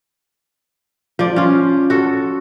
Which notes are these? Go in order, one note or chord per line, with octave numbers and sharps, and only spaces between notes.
F3 D5
C#4 F4
F#4 A4